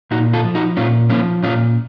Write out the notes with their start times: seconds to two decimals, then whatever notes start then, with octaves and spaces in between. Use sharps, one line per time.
0.11 A#2 D#4 F#4
0.33 F4 A4
0.44 F3
0.55 D#4 F#4
0.77 A#2 C#4 F4
1.10 F3 A#3 C#4
1.43 A#2 C#4 F4